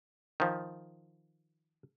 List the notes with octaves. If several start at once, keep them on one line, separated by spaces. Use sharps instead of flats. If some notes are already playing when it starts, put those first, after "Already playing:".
D#3 F3